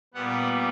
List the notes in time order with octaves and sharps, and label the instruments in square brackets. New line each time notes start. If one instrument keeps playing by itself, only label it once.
[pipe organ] A#2 G3 B3 F#5